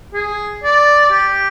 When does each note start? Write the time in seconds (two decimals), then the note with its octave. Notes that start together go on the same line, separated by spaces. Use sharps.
0.14 G#4
0.63 D5
1.11 G4